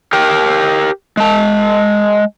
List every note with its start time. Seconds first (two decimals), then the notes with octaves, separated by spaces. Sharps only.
0.13 G4 A#4 G5
1.17 G#3 A5